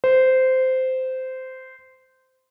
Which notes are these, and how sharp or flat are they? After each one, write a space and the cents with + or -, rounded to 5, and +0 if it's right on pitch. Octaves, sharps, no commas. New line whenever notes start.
C5 -15